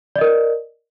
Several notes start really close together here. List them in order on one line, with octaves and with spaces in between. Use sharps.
D5 D#5 A#4